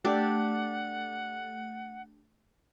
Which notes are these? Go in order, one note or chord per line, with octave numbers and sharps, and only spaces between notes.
A3 D4 G4 D5 F#5